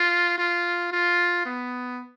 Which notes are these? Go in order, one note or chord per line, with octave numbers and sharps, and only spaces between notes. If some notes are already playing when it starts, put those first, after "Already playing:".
Already playing: F4
F4
F4
B3